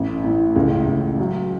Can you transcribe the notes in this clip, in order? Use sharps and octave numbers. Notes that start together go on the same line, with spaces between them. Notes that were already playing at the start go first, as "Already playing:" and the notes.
Already playing: A1
A2
C#2
C#2
F#3